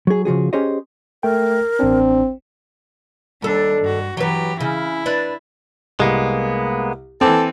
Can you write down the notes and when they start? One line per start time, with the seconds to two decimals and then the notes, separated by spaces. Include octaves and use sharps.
0.07 F#3 G#4
0.25 C#3 F3 F#4 G#4
0.53 C#4 G4 G#4 C5 C#5 D#5
1.23 A3 A#4 G5
1.80 A1 C4 D4
3.42 D#2 G3 D4 A4
3.82 G2 F#4
4.17 E3 F#3 G4 B4
4.60 C#3 E4
5.06 D4 B4
6.00 C2 G#3 A#3 B3
7.21 E3 C4 A4 D6